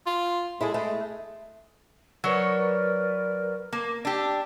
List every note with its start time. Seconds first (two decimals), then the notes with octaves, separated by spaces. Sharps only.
0.07 F4
0.61 G#3 E4 G#4 A4
0.74 G#3 A3
2.24 F#3 A#4 B4 C#5 D5
3.72 A#3
4.05 D4 G4 E6